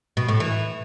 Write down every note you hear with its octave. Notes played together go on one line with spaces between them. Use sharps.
B2
A2
E3